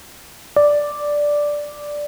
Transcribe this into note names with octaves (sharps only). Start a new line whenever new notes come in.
D5